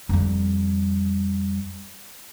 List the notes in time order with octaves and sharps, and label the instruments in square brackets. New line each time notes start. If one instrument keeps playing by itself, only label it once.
[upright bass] F2 G3